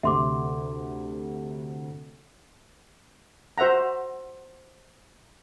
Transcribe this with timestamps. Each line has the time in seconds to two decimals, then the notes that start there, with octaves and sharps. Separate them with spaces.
0.03 D2 C3 E5 C6 D6
3.58 F#4 C5 E5 F#5 A#5